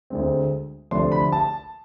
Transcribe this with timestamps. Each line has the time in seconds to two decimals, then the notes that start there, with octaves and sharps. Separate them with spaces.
0.10 D2 D3 G#3 C4
0.91 D2 C3 F3 A3 D4 C6
1.12 B5
1.32 A5